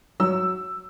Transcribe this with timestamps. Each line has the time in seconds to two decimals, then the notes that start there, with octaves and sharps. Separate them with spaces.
0.20 F#3 E6